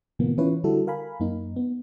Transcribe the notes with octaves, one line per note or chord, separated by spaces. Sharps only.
A2 C3 D#3 F3 A#3 B3
E3 C#4 E4 F4 B4 C#5
D3 G3 E4 F#4 A4
A#4 F5 G#5 B5
F#2 A#3 D#4
B3